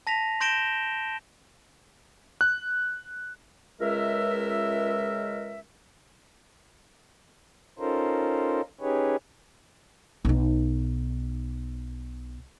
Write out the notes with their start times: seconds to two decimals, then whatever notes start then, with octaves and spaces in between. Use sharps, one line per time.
0.07 A5 A#6 B6 F7
0.41 C6 G6 A#6 D7 E7 G7
2.41 F#6
3.81 C#2 G#3 A#4 E5
7.79 C#4 D#4 F4 A4 A#4 C5
8.81 C#4 D#4 G4 G#4 B4 C#5
10.25 B1 D#4